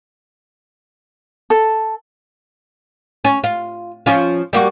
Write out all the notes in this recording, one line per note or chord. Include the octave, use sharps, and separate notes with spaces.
A4
C#4
F4
F3 C#4 F4
G3 A#3 F#4